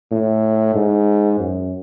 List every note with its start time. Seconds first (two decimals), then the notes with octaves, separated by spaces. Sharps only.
0.12 A2
0.75 G#2
1.40 F#2